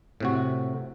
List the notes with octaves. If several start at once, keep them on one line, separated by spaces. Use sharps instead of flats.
A2 C3 F#4